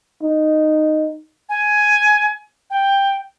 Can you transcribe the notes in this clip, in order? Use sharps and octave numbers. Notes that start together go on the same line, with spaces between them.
D#4
G#5
G5